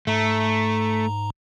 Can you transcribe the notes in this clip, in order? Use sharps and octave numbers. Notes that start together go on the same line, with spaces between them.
G#2 A3 A#5